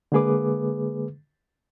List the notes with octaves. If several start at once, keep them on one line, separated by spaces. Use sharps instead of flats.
D3 G#3 A#3 G#4 B4 D6